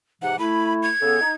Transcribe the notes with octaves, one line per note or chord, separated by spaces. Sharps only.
G#2 C3 E3 F#5
A3 E4 B5
G#6
C#3 B3 A4
D#4